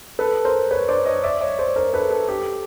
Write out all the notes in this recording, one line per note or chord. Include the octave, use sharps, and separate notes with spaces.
A4 B4
A#4 C5
B4 C#5
C5 D5
C#5 D#5
D5 E5
C#5 D#5
C5 D5
A#4 C5
A4 B4
A4 B4
G4 A4